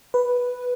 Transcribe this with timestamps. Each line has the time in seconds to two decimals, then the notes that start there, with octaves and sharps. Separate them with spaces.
0.14 B4